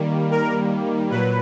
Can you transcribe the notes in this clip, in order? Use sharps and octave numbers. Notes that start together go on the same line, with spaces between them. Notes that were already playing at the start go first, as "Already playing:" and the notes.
Already playing: D#3 G3 A#3
A#4
A#2 F#3 B4